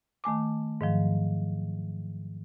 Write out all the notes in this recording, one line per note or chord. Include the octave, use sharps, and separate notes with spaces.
D#3 A3 G#5 D6
G#2 D#3 F3 F#3